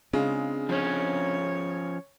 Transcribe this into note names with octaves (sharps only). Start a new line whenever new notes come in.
C#3 G#3 C4 D4 F4
F3 C#4 C#5